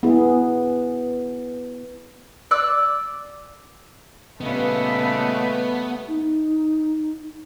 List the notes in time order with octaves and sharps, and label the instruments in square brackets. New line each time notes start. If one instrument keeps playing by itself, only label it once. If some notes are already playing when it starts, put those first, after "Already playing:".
[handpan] B3 E4 G#4
[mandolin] D5 E6 F#6
[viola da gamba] A#2 C#3 G3 [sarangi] A3 [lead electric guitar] B3 [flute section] B4 D#5 E5
[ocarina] D#4